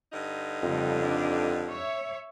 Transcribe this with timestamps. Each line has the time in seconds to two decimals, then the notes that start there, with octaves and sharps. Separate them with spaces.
0.12 G2 D3 D#4
0.63 F2 C#3 G3
0.99 D4
1.70 C#5 E5